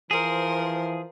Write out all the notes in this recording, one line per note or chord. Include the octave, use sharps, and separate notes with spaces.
E3 F3 G#4 A#4 C5